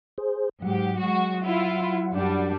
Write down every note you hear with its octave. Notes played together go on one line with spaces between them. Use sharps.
G#4 C5
G#2 F#3 G4 F#5
G#3 F#4
E4 F4
F#2 G3 D4